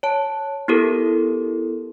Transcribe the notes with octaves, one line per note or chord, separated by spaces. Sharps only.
C#5 A5
B3 E4 G4 A4 A#4